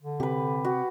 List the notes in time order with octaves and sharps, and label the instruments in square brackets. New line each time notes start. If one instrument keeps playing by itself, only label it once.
[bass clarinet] D3
[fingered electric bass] C3 [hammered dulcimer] G4 B4
[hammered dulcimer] F#4